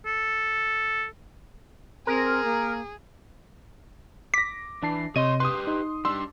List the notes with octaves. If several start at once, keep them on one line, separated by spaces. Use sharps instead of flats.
A4
C4 G#4 A#4
A#3
D6 A#6 B6
E3 D4 A5 C7
C3 C#5 D#5 C6 D#7
G4 B4 C6 D#6
D#4
G3 D4 C6 E6